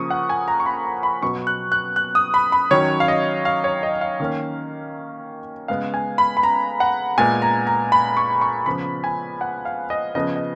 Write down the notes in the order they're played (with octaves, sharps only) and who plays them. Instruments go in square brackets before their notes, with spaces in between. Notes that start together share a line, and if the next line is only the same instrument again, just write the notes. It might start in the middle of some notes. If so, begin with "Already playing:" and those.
Already playing: [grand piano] C#3 F3 A#3 C#6 D#6
F#5
G#5
A#5
C#6
B5
A#5
B5
B2 F#3 B3 C#6
F#6
F#6
F#6
D#6
B5
B5
D#3 F#3 C#4 C#5
F5
D#5
F5
C#5
D#5
F5
D#3 A#3 C#4
C#3 G#3 B3 F5
G#5
B5
B5
A#5
F#5
A#2 G#3 B3 G#5
A#5
A#5
B5
C#6
C#6
C#3 F3 B3 B5
G#5
F#5
F5
D#5
C#3 F3 B3 D#5
D#5